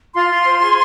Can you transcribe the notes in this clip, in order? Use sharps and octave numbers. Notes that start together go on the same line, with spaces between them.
F4 C6
F4
C5
G#4